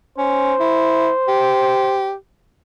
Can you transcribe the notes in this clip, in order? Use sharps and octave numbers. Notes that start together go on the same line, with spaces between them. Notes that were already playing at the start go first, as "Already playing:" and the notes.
C#4 C5
E4
G4